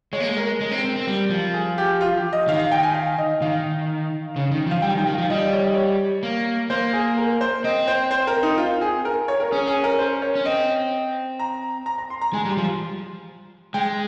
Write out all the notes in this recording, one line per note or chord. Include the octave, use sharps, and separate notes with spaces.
G#3 C#5
A#3
G#3
A#4
G#3
C4
C4
C4
G3
F3
G#4
G4
F4
G4
D#5
D#3 F5
F5
G5
G#5
F5
D#5
D#3 F5
C#3
D#3
F3 F5
G3 G5
D#3
G5
D#3
F3 F5
G3 D#5
C#5
D#5
C#5
A#3
A#3 C5
G#4
A#4
C5
C4 D#5
C5
C5
A#4
D#4
F4
G#4
A#4
C#5
A#4
C#4 G#4
G#4
A#4
C5
C#5
C#4
C4 D#5
A#5
A#5
A#5
C6
A#5
G#3 G#5
G3
C6
F3
G#3 G5